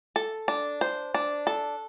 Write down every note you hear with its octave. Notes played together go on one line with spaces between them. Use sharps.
A4
D4
C5
D4
A4